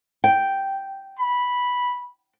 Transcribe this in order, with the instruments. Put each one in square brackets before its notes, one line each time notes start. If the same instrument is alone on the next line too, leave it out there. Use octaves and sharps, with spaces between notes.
[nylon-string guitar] G5
[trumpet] B5